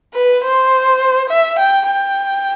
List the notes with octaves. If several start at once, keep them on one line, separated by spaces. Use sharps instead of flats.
B4
C5
E5
G5
G5